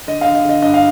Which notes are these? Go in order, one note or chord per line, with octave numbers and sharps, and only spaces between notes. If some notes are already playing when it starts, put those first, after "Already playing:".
D3 D#5
D3 F5
D#5
D3 D#5
G2 D#5
F5